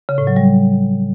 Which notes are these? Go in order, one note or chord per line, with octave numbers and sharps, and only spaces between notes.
C#3
A2
F#3
G3